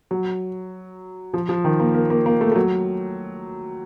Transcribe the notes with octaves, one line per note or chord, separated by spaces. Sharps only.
F#3
F3
F3
D#3
A#3
A#3
A#3
A#3
A3
A3
F#3